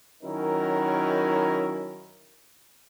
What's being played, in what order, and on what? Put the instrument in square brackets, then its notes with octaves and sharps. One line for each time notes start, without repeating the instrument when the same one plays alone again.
[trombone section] D#3 F#3 C#4 D#4 E4 A#4